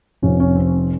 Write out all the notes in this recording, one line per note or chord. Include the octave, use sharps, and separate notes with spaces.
F1 F2 C3 F3 C#4
C#4
C4